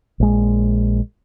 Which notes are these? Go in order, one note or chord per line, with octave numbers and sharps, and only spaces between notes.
A#1 G#3